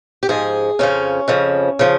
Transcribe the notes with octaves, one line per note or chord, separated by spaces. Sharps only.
G4
G#2 F3 G#4
F2 C#3 F3 C#4
F2 C#3 F3
C#3 F3